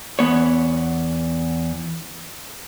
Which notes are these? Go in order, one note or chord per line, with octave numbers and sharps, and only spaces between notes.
E2 B3 C#5